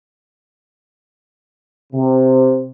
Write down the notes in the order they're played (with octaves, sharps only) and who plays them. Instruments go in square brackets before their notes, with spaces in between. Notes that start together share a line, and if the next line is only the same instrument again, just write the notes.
[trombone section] C3